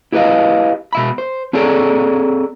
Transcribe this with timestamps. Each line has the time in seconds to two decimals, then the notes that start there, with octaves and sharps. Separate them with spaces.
0.12 E4 G4 B4 C#5 D#5 F5
0.93 B2 E5 B5
1.18 C5
1.53 C4 G#4 A4 C#5 D5 A#5